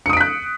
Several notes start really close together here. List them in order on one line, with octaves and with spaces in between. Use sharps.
C#7 D#6 D7 B6 F#6